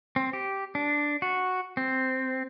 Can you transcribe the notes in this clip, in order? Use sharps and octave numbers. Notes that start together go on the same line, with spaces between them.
C4
G4
D4
F#4
C4